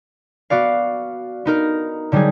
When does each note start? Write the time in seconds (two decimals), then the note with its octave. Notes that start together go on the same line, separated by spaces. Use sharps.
0.50 B3 F#4 D5 F5
1.45 B3 D#4 A#4
2.12 D3 F#3 G3 D4 D#4 G#4